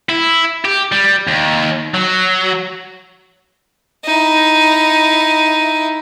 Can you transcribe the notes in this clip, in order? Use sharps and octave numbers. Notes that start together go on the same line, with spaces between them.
E4
G4
G3
D#2
F#3
D#4 E4